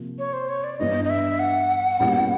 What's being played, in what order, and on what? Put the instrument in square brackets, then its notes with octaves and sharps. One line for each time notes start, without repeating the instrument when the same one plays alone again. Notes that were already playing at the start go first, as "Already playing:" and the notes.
Already playing: [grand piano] C3 F3 A#3
[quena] C#5
C5
C#5
D5
[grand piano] G2 E3 G3 B3 [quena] D#5
[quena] D#5
E5
F#5
[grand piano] B2 G3 A#3 C#4 E4